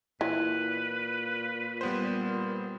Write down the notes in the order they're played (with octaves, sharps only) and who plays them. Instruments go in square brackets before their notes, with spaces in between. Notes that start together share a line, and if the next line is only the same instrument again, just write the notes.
[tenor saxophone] A#2 [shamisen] E3 [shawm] B4
[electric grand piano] G3 B3 C5